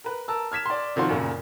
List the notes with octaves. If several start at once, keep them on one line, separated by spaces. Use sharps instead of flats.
A#4 B4
A#4 A5 E6
F6 G#6 B6 E7
D5 C6
C3 D#3 F3 F#4 C6
F#2 A#2 C#3